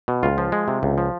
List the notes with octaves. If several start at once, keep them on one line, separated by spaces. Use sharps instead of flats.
B2
C#2 F4
F3
G#3
C3
C#2
F3